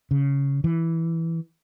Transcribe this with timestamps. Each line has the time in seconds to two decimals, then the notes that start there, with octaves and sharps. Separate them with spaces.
0.11 C#3
0.64 E3